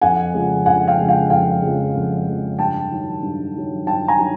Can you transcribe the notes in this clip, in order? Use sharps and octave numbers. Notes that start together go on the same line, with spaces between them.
F2 F#5 G#5
C#3 F3 G#3
F2 F#5 G#5
F5 G5
C#3 F3 G#3
F5 G5
F2 F5 G5
C#3 F3 G#3
F2
C#3 F3 G#3
G2 G5 A5
D#3 F#3
G2
D#3 F#3
G2 G5 A5
G#5 A#5
D#3 F#3